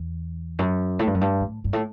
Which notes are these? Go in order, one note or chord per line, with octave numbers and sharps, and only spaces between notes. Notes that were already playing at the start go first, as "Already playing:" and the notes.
Already playing: E2
F#2
A2
G2
F#2
G2
A2
G2
A2